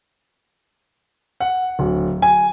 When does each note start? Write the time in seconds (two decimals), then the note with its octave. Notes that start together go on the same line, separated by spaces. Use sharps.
1.40 F#5
1.79 D1
2.22 G#5